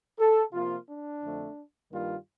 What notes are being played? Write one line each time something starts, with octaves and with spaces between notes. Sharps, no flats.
A4
C3 F3 A#3 F4
D4
F2 D3 A3 C4
G2 D#3 G3 A#3 F4